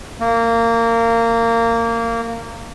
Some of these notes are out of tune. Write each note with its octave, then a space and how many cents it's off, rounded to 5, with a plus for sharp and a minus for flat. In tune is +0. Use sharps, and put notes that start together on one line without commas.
A#3 -20